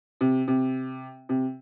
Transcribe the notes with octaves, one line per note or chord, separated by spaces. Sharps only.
C3
C3
C3